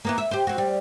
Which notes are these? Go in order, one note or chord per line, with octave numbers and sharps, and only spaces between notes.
A#3 B3 E4
E5
G4 C5
C4 F#4
G3